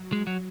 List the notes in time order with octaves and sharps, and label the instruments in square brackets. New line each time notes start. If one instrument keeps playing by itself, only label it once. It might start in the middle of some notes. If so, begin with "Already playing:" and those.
Already playing: [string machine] F#3
[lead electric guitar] G#3
F#3